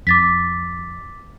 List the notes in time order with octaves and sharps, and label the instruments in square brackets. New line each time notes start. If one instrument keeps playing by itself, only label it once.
[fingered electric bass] F2 [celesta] D6 A6 B6